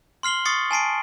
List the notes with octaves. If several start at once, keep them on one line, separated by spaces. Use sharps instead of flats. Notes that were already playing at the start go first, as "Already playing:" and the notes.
C6 F6 C7 F#7 G7
C#6 D#6 A6 C7 C#7
G#5 A5 C7 D7